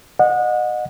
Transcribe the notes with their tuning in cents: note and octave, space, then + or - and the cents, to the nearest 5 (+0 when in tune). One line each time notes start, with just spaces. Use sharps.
D#5 -25 F#5 -30